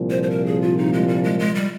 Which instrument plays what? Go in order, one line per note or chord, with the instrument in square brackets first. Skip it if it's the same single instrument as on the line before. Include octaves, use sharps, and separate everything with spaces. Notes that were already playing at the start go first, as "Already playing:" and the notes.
Already playing: [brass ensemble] C2 A#2 F3
[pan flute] C5
C5
A#4
G#4
F4
D#4
G#3
G3
G#3
G#3
G3